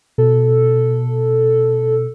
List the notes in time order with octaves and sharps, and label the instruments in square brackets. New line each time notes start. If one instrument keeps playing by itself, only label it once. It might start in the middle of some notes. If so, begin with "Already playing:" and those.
[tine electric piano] B2 [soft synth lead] A4